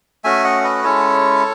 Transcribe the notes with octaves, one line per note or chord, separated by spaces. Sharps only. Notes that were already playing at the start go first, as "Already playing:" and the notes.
A3 C#4 F#4 E5 G#5
D#5 F#5
B4 D#5
G#3 C#4 E4 A4 C#5